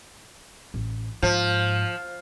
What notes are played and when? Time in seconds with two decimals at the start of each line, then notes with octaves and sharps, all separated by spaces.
0.74 A1
1.22 G#2 F3